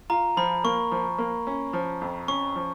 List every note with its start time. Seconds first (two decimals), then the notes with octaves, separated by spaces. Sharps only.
0.10 F4 A#5
0.37 F3 B5
0.64 A#3 C#6
0.91 F3
1.18 A#3
1.47 C#4
1.73 F3
2.01 F2
2.28 C#4 C#6
2.56 F3